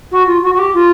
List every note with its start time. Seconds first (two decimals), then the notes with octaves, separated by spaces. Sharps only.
0.12 F#4
0.27 F4
0.43 F#4
0.54 F#4
0.59 G4
0.74 F4